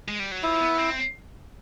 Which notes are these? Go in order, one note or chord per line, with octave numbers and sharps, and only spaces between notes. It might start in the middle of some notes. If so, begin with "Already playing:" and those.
G#3
G3
F#3
F3 E4
B3
C4